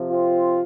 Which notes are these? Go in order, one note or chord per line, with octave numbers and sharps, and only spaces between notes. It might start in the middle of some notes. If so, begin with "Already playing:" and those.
Already playing: C3 F3
C4 F4